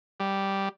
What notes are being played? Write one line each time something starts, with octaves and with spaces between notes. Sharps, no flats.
G3